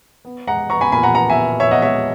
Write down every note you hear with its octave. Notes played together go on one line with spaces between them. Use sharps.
B3
G#3 F#5 A#5
B3 A#5 C#6
G#5 B5
A#2 G#5 B5
F#5 A#5
B3 F#5 A#5
E5 G#5
B3
B3 C#5 E5
D#5 F#5
G#3 C#5 E5